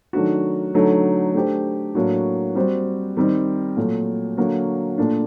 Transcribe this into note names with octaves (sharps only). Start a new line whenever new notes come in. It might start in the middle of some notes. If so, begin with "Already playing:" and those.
D#3 F#3 A3 D4 F#4
D3 F#3 A3 D#4
A3 D4 G4 C5
A2 F#3 A#3 D4 F#4
G3 C4 F#4 C5
D#3 G3 C4
A#2 F#3 A3
D3 F#3 A#3 F#4 A#4
A#2 A3 D4